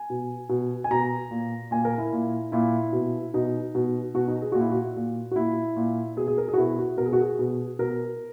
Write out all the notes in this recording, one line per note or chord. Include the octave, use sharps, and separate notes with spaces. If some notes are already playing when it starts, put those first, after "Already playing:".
Already playing: G#5
B2
B2
G#5
B2 A#5
A#2
A#2 G#5
A#4
E4
A#2
A#2 E4
B2
B2 D#4
B2
B2 F#4
D#4
G#4
A#2 F#4
E4
F#4
A#2
F#4
A#2 E4
A#2
B2 G#4
G#4
A#4
G#4
F#4
B2 E4
F#4
B2 A#4
G#4
F#4
G#4
B2
B2 A#4